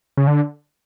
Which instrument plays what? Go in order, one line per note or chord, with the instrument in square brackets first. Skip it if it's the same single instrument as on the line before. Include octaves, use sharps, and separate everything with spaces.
[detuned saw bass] C#3
D3